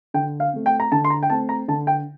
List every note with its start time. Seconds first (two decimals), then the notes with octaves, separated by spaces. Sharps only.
0.14 D3 G5
0.40 F5
0.53 A3 C4
0.66 G5
0.80 A#5
0.92 D3 A5
1.05 C6
1.10 A#5
1.23 G5
1.30 A3 C4 A5
1.49 A#5
1.68 D3 A5
1.87 G5